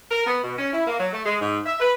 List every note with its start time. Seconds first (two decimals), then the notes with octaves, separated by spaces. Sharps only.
0.11 A#4
0.27 B3
0.44 B2
0.58 C#4
0.73 E4
0.87 A#3
1.00 F#3
1.12 A3
1.26 G#3
1.41 G#2
1.66 E5
1.80 B4